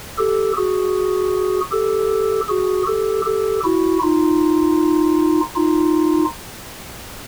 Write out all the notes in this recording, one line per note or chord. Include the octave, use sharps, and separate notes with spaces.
G4 A4
F#4 G#4
G4 A4
F#4 G#4
G4 A4
G4 A4
E4 F#4
D#4 F4
D#4 F4